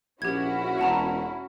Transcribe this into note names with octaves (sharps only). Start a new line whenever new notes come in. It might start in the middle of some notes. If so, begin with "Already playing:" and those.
A#1 C#4 E4 F#4 G4 G#6
E1 F#5 A5 A#5